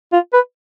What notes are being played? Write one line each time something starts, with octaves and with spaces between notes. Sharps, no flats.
F4
B4